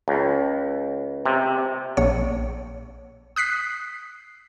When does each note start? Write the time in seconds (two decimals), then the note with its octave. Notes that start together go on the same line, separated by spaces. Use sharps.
0.08 C#2
1.26 C3
1.97 A#1 C#5
3.36 D#6 F#6 B6 C7